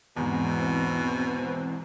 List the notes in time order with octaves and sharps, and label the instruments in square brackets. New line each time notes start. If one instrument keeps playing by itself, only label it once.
[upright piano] E2 G#2 [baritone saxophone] B2 [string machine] E3 C4